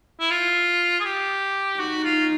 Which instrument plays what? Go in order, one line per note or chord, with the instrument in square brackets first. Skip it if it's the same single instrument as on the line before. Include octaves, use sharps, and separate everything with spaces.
[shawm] E4
F4
G#4
G4
[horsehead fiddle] D#4 [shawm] F#4
[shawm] F4